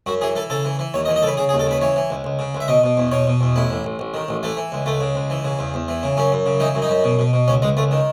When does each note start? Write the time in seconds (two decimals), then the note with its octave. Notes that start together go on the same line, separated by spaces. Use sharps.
0.06 F#2 F#4
0.21 E3 G#4
0.35 E3 A4
0.50 C#3 A4
0.65 E3
0.79 E3
0.94 D#2 C#5
1.05 D#5
1.08 E3
1.16 D#5
1.23 C#3 A4 B4
1.37 C#3 G#4
1.49 G#4
1.53 D#2
1.59 A4
1.66 C#3 B4
1.81 E3 C#5
1.96 E3
2.10 C#2
2.24 C#2
2.39 C#3
2.55 C#2
2.60 E5
2.68 B2 D#5
2.84 B2
2.97 E2
3.11 B2 C#5
3.27 B2
3.41 E2
3.56 A1 E4
3.70 A1
3.84 A1
3.99 A1
4.14 D#3
4.29 A1
4.43 E3 A3
4.57 E3
4.72 C#2
4.86 C#2 A3
5.01 C#3
5.15 C#2
5.30 E3
5.44 C#3
5.59 E2
5.74 E2
5.88 E3
6.03 C#3
6.17 F#2 C#4
6.32 F#2
6.46 C#3
6.60 E3 D#4
6.75 F#2
6.82 D#4
6.89 F#2
7.04 B2
7.19 B2
7.33 B2
7.48 C#2 C#4
7.62 C#2 G#3
7.77 C#2 A3
7.91 D#3